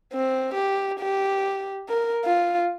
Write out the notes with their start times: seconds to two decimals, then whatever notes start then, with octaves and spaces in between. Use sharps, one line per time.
0.13 C4
0.54 G4
0.99 G4
1.89 A#4
2.25 F4